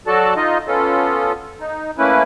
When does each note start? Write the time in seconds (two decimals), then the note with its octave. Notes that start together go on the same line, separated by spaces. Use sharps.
0.07 F#3 F#4 A4 D5 A5
0.36 D#4 F4 D#5
0.67 B3 C#4 F4 A4
1.60 D#4
1.98 A3 A#3 C#4 E4 B4